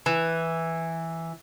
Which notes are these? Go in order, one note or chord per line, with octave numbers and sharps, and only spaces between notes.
E3